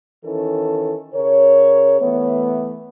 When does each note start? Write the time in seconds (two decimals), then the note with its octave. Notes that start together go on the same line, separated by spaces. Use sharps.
0.25 D#3 E3 C#4 A4
1.14 C#3 A#4 C#5
2.01 E3 A3 B3